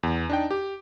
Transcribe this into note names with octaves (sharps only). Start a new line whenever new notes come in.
E2
D4 D#4 G5
G4